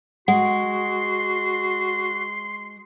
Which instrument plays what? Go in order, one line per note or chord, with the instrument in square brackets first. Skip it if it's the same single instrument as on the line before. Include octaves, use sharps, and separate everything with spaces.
[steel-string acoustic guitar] G#3 [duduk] F#4 [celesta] F#5 [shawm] C6